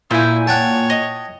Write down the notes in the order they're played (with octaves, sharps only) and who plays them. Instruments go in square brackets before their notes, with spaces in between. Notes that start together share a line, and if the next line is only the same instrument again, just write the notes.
[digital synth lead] A#2 [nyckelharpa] E4 [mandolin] G#5 G6
[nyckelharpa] C#5 [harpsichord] F#5 G5 A5
[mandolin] D#5